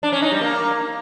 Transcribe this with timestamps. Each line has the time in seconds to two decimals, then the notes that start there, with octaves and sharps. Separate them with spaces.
0.03 D4
0.12 C#4
0.22 D#4
0.32 G3
0.41 A#3